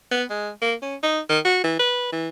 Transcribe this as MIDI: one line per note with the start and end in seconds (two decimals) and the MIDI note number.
0.11 0.24 59
0.30 0.50 56
0.62 0.74 58
0.82 0.95 61
1.03 1.20 63
1.29 1.39 51
1.45 1.60 66
1.64 1.77 52
1.79 2.11 71
2.12 2.29 52